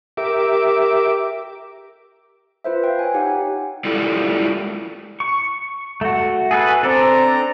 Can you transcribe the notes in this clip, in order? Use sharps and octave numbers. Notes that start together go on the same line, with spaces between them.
G4 A#4 E5 D6
F4 B4 C5 E5
F5 G5
C#5 G#5
D#4 G4 F#5 G#5
G#3 E4 F4 G4 A4 D5
C#6
A3 F#4
G#4 A4 B4
C4 D4 A4 D5 A#5